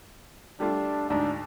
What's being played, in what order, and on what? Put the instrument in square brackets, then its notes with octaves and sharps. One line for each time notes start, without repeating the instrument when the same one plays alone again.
[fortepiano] G3 A3 F4 [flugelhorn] D4
[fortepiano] D2 G#2 [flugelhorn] D4